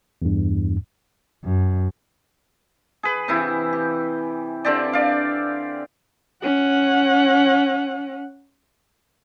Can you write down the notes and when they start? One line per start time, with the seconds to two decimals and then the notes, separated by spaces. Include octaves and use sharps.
0.22 E2 G2
1.45 F#2
3.03 G#4 B4
3.28 C3 E3 E4
3.73 G4
4.65 D3 C4 G4 D5
4.93 D5 F5
6.42 C#4 F#5